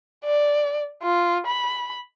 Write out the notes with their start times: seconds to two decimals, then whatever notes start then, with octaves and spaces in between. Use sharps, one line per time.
0.25 D5
1.03 F4
1.47 B5